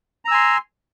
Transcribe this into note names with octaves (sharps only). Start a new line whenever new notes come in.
G#5 A#5 C6 E6